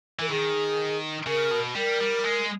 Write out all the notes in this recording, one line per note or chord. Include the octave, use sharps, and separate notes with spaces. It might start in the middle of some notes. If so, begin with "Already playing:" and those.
E3 A#4
D#3 G#4
C#3 A#4
B2
G3 A#4
G3
G#3